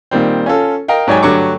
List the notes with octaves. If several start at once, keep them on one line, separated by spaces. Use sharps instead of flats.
A#2 D#3 G3 C4
C#4 F4 A4
A#4 D#5 F5 G5
G#2 F#3 C#5 D5 G5 G#5
G2 D3 F#3 A3 C#6 D6